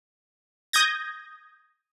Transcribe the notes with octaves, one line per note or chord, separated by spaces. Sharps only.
D#6 G6 G#6 A#6